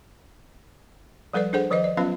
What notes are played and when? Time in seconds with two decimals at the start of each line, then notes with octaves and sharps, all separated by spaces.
1.33 F3 G3 A4 B4 D5
1.53 D4 G#4 A4 C5 F#5
1.70 D#3 F3 B4 C5 D#5
1.84 D5
1.97 F#3 B3 C#4 F4 B4 F5